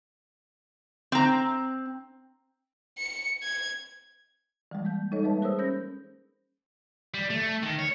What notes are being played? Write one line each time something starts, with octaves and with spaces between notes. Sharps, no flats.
C4 A#5
C#7
G#6
E3 G3 G#3
A#3 G6
G3 G#3 D#4 A4 C#5 D#5
G3 G#3 A#3 B4 E5 A5
G#4 A#4 C5 C#5 D#6 E6
C#4 C5 G6 A#6
G3
A3
D#3
C#5